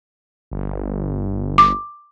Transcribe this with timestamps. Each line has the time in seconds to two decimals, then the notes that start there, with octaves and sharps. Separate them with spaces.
0.51 G1
1.58 D6